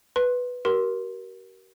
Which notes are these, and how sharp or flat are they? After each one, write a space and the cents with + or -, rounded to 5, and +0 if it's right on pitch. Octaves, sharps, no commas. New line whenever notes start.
B4 +0 C6 +20
G4 -45 A#4 +20 C6 +0